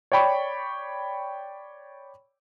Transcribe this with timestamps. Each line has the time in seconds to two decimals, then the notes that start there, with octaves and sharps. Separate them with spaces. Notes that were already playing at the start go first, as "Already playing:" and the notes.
0.12 C#5 D5 G5 B5 C#6